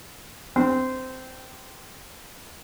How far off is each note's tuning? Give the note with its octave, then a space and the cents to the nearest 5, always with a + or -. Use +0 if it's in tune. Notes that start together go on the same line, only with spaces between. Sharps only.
C4 -15